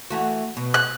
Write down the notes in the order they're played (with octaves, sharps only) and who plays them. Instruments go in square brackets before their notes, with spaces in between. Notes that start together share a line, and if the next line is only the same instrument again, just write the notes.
[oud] E3 A3 F#4
B2
[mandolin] F#6